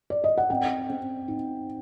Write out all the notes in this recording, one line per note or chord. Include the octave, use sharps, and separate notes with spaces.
D5
D#5
F#5
C4 G5
C4
D#4